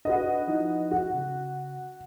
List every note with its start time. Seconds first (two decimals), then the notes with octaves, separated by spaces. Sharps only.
0.05 D4 F#4 B4 D#5
0.48 F3 D#4 E4
0.91 F#4
1.14 C#3